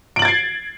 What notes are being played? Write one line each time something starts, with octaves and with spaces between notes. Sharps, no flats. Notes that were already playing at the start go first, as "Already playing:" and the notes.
G#6 A6 C7 D7 F#7